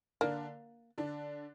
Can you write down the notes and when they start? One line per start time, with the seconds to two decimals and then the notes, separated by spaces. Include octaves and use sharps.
0.21 D3 A#3 D4
0.98 D3 D4